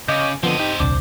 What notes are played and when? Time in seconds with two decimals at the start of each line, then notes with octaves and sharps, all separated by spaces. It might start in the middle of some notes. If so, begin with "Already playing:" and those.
0.08 C#3 C#5 D#5 D6 G6
0.43 D3 F3 B3 C4 D#5
0.59 D#4 G4
0.80 D#1 C2 D4 C5 D6